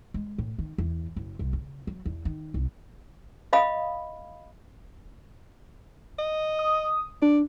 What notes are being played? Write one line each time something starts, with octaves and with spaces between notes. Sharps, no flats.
G#3
A2
D#3
E2
F#1
C2
C#3
F#3
E2
D#3
C2
D#5 F5 B5 D#6
D#5
D#6
D4 D5